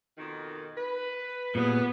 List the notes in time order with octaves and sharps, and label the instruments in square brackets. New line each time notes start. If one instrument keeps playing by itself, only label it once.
[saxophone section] F2 B2 D#3
B4
[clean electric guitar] A#2 [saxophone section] C#3 G3 G#4 [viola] B3